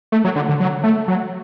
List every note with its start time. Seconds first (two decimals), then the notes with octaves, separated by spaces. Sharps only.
0.12 A3
0.24 F#3
0.36 D3
0.49 D3
0.60 F#3
0.83 A3
1.08 F#3